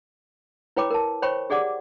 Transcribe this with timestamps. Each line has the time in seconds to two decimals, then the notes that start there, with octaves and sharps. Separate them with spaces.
0.77 E4 B4 C#5 G5 B5 D6
0.90 A#4 A5
1.22 C5 C#5 G5 B5 C#6
1.50 G4 G#4 D5 F#5 D6